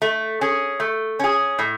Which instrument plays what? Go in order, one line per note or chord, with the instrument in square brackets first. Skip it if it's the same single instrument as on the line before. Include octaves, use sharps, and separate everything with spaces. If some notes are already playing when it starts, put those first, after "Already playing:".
[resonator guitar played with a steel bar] A3
C#4 G#4
A3
C#4 G#4
A2